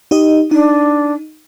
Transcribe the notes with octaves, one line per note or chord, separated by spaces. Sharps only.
D#4 G4 D#5
D4 D#4